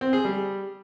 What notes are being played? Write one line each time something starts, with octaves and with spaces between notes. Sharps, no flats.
C4
G#4
G3